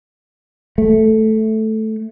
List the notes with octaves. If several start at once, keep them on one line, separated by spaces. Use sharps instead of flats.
A3